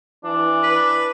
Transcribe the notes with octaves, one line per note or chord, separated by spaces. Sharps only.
E3 D4
B4